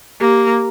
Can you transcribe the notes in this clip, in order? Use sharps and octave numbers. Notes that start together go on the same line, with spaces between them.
A#3 G4